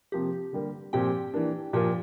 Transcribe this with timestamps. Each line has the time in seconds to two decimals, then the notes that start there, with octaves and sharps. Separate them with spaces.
0.12 C3 F3 A#3 G4
0.53 D3 G3 A#3
0.93 A#2 F3 C4 G4 G5
1.34 E3 A#3 D4
1.73 A#2 F3 A#3 F4 G4 G5